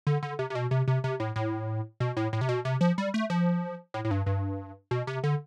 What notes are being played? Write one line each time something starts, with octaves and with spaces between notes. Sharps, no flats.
D3
D3
C3
C3
B2
C3
C3
C3
A2
A2
B2
A2
A2
C3
B2
C3
F3
G3
A3
F3
A2
A2
G2
G2
B2
C3
D3